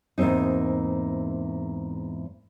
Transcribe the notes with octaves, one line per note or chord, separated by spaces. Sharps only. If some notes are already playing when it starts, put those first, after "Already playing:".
E2 G#2 A#3 C4 D#4